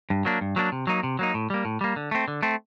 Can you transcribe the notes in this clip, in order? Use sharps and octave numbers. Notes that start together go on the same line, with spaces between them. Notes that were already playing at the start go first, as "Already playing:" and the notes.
G2
F#3 A#3 D4
G2
F#3 A#3 D4
C3
F#3 A#3 D#4
C3
F#3 A#3 D#4
A2
G3 A#3
A2
G3 A#3
D3
A3 C4
D3
A3 C4